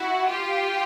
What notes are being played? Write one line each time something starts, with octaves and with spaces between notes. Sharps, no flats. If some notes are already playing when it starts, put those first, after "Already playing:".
Already playing: E4 F#4
F4 G4